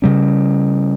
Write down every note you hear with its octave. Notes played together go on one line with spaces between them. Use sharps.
C#3 G3 C#4